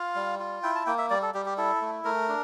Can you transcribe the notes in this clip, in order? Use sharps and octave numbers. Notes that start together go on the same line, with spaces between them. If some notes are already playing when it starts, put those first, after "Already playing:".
Already playing: F4 F5
G3
F4
E4 G5
A5
A#3 G5
E5
G3 D5
A4
G3 G4
G4
E4 A4
A3
A3 A#4
D4